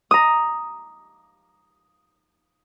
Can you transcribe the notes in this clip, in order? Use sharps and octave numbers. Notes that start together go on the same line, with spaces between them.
A#5 D#6